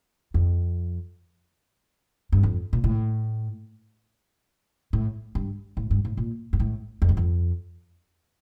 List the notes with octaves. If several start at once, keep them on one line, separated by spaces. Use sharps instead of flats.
F2
G2
F2
A#2
A2
A2
G2
A2
G2
A2
A#2
G2
A2
F2
G2
F2